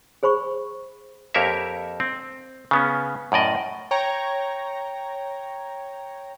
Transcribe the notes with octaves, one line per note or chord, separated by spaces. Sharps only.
G#4 C5 B5 C#6
F2 A#3 G4 A#4 C#5 E5
C4
C#3 B3 C#4
F#2 A2 D5 D#5
C#5 G5 A#5